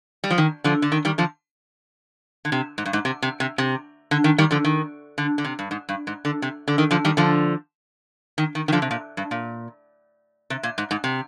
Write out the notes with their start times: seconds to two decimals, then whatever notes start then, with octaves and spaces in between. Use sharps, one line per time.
0.24 G3
0.30 F3
0.38 D#3
0.64 D3 F3
0.82 D3
0.92 D#3
1.05 D#3 G3
1.18 D3 F3
2.45 D3
2.52 C3
2.78 G#2
2.85 G2
2.93 G#2
3.05 C3
3.22 C3
3.40 C3
3.58 C3
4.11 D3
4.24 D#3
4.38 D#3 G3
4.51 D3 F3
4.65 D#3
5.18 D3
5.38 D3
5.44 C3
5.59 G2
5.71 G#2
5.89 G2
6.07 G#2
6.25 D3
6.42 C3
6.68 D3
6.78 D#3
6.91 D3 F3
7.05 D#3 G3
7.17 D3 F3
8.38 D#3
8.55 D#3
8.68 D#3
8.72 D3 F3
8.82 C3
8.91 A#2
9.17 G2
9.31 A#2
10.50 C3
10.63 A#2
10.78 G#2
10.91 G#2
11.04 C3